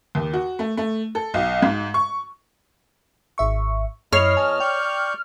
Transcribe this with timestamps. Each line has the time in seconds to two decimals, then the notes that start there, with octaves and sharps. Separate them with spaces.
0.15 D#2
0.33 F#4
0.59 A3
0.77 A3
1.15 A4
1.34 B1
1.62 G#2
1.94 C#6
3.38 G#1 E5 C#6
4.12 F#2 E4 C#5 D#5 F6 C7
4.37 E2 D#5 G#5 A5
4.60 D5 G5 C#6 G6